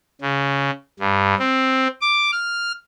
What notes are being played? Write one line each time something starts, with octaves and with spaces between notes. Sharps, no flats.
C#3
G2
C4
D6
F6